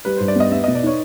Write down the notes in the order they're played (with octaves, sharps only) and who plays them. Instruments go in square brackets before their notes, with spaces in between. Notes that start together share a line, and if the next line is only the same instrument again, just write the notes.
[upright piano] G3 [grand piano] B4
[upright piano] G2 [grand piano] C5
[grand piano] D5
[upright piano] B3 [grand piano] D#5
[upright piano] B3 [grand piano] E5
[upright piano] B2 [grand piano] D#5
[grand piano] D5
[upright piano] D#4 [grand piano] C#5